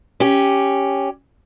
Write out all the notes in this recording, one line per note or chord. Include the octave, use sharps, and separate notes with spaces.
C#4 G4